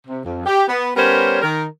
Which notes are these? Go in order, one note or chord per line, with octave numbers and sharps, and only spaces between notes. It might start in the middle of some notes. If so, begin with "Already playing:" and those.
C3
F2
G4
B3
G3 B3 C#4 A#4 C5 C#5
D#3 A#4